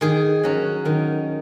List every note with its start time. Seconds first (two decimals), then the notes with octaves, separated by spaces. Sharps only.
0.01 D#3 G#4
0.43 F#3 C#4
0.85 D#3